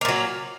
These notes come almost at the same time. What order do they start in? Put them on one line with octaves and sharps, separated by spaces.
A#3 A#2 F#3